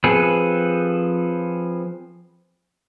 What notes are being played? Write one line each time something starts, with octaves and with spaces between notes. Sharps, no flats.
F3 C4 G#4 A4 B4